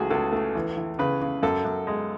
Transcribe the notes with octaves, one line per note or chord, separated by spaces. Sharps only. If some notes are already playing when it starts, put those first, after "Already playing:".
Already playing: C#2 E3 A3 F#4 G#4
C#2 A4
A3
E3
E3
C#3 B4
C#3
F#2 A4
F#2
G#3